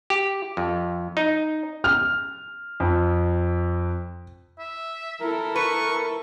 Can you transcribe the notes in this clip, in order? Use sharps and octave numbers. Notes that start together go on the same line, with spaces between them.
G4
F2
D#4
F6
F2
E5
E4 A4 A#4
B4 C#6